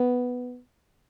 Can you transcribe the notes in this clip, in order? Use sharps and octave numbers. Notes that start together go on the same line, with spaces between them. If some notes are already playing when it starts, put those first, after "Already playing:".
Already playing: B3